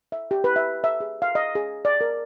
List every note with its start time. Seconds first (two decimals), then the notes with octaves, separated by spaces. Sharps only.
0.12 E5
0.31 G4
0.44 B4
0.56 E5
0.84 E5
1.00 G#4
1.22 F5
1.35 D#5
1.55 G#4
1.85 D5
2.01 A#4